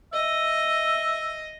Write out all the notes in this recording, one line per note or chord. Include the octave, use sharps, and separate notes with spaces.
D#5 E5